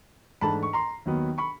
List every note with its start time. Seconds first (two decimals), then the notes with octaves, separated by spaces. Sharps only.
0.41 G#2 E3 A3 D4 A5 B5
0.63 C#6
0.73 A#5 C6
1.05 D#2 D#3 F#3 B3
1.38 B5 C#6